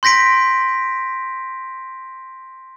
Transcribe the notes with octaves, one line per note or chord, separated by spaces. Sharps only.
C6 G6 A#6 B6 D7